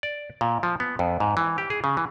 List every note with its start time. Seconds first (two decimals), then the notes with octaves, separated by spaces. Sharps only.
0.03 D5
0.41 A#2
0.63 F3
0.80 B3
0.99 F2
1.20 G#2
1.37 E3
1.58 G4
1.70 G#4
1.84 C#3
1.97 E3